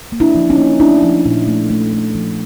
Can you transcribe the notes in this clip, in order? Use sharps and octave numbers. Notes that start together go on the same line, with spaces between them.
A#3
D4 E4
F3
C#4 D#4
A#3
A3 D4 E4
F3
A#2
A3
A3
A3
F3